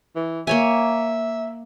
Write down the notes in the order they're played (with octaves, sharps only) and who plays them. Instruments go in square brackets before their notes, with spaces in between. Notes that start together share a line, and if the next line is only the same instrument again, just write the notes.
[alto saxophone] E3
[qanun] A#3 C#5 G#5 [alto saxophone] E5